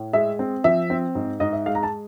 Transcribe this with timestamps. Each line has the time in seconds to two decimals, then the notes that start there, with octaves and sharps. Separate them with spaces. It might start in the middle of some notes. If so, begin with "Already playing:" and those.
Already playing: A2
0.13 G#3 E5
0.39 C4
0.64 F3 E5
0.90 C4
1.15 G#2
1.40 G#2 D#5
1.53 E5
1.66 G#3 F5
1.75 A#5
1.83 A5